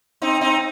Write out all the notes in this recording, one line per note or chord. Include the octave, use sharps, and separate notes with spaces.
C4 D#4
C4 D#4